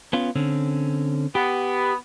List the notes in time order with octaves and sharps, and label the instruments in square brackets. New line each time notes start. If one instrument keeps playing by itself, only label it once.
[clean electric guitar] B3 C#4 F4
D3 C4 C#4
[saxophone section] B3 [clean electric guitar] G4